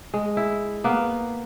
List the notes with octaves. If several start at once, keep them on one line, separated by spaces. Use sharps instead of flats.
G#3
E4
A#3 B3